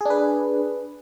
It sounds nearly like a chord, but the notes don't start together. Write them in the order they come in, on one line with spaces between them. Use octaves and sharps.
G#4 D4 B4